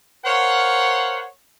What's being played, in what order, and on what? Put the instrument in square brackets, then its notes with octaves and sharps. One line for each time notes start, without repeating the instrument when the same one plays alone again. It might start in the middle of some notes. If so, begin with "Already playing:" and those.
[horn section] A#4 C5 C#5 F5 F#5